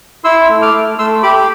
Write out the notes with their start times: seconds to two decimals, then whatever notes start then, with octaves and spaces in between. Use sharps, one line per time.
0.24 E4 C6 E6
0.49 A3
0.62 D6 F6
0.74 A3
0.98 A3 C6 E6
1.23 G4 B5 D6
1.36 D6